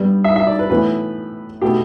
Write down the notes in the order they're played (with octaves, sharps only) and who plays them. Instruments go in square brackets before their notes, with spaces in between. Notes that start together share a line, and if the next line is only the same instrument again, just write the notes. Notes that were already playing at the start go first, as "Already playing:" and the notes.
Already playing: [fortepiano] G2 G3 B3
E5
E5
D5
B4
A2 E3 B3 B4
B2 A3 G4